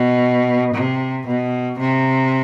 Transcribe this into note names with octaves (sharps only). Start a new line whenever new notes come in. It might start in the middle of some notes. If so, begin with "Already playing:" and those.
Already playing: B2
C3
B2
C3